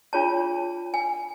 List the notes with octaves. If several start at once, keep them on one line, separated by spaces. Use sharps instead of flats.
D4 F4 G#4 C#5 A5
G#5